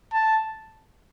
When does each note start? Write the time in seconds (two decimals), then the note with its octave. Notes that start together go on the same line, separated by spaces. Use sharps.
0.13 A5